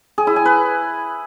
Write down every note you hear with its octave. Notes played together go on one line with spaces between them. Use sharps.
G#4
E4
G#5
B4